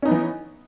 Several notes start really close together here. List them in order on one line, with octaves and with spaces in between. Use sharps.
C#4 D#4 B3 E3